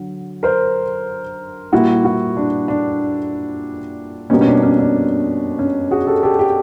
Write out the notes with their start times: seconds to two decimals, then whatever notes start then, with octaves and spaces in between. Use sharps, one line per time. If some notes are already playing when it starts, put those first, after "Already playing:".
Already playing: D3 F#3
0.43 A#4 C5
1.72 A#2 G3 A#3 E4 F#4
2.04 E4 F#4
2.37 D4
2.68 D4
4.30 B2 G3 A#3 C#4
4.41 C#4
4.46 D4
4.63 C#4
4.78 D4
5.59 C#4
5.91 F#4 G#4
6.06 G4 A4
6.23 G4 A4
6.39 G4 A4